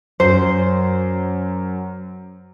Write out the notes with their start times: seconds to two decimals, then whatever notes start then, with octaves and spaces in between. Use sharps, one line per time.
0.20 F#2 C5